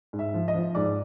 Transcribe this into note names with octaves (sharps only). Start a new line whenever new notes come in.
G#2
E5
F3
D#5
F3
G#2 D5